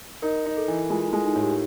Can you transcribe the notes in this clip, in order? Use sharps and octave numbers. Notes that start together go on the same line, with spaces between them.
D#4 A#4
D#4
A4
E3
G#3 F4
E4
G#3
D#4
A2
G4